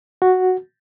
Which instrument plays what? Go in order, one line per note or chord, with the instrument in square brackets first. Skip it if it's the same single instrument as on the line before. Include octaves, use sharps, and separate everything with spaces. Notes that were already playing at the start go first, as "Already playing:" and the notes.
[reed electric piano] F#4